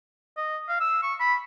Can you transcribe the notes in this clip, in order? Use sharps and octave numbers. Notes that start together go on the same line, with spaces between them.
D#5
F5
E6
C#6
B5